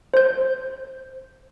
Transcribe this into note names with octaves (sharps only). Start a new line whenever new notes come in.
C5 G6